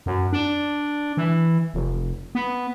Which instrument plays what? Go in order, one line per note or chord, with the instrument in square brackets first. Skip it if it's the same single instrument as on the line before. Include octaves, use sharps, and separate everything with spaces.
[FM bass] F#2
D4
E3
F1
B3